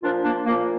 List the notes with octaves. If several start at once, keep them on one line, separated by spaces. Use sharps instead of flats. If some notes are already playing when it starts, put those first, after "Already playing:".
A#2 F3 D4 F4
A#3 D4
A#2 F3 A#3